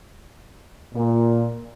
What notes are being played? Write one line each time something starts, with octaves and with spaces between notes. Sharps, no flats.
A#2